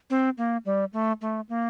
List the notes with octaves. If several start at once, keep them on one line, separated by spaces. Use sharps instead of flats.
C4
A#3
G3
A3
A3
A#3